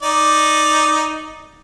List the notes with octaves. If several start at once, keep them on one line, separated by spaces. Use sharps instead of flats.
D#4 D5